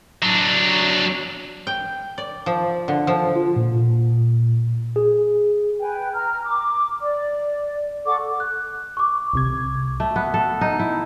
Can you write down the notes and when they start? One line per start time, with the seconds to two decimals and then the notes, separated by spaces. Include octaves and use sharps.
0.22 F#3 D4
1.67 G5
2.18 D5
2.46 F3
2.88 D3
3.07 F3
3.36 F4
3.56 A#2
4.96 G#4
5.81 B4 G5 G#5
6.14 A#5 F6
6.46 D6
7.02 D5
8.06 A4 F#5 C#6 D6
8.40 F#6
8.97 C#6 D6
9.33 C2 C3 G#6
10.00 A3
10.16 B3
10.34 A4
10.61 D#4
10.79 E4